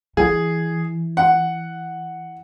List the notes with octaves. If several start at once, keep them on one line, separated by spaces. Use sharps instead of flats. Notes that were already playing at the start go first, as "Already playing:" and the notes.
E3 G#4
F#5